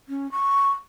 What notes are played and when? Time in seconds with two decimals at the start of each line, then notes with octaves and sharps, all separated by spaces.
0.09 C#4
0.32 C#6